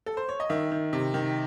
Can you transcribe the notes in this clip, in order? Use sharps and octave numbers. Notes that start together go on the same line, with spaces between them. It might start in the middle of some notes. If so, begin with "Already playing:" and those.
A4
C5
C#5
D#5
D#3 E5
D#3
C3
D#3